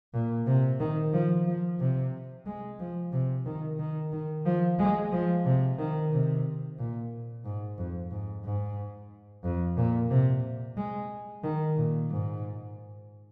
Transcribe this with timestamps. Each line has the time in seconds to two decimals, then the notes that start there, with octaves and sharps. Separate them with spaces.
0.14 A#2
0.47 C3
0.80 D#3
1.14 F3
1.47 F3
1.80 C3
2.46 G#3
2.80 F3
3.12 C3
3.46 D#3
3.79 D#3
4.13 D#3
4.46 F3
4.79 G#3
5.12 F3
5.46 C3
5.79 D#3
6.12 C3
6.78 A#2
7.45 G#2
7.78 F2
8.11 G#2
8.44 G#2
9.44 F2
9.77 A#2
10.11 C3
10.77 G#3
11.44 D#3
11.77 A#2
12.10 G#2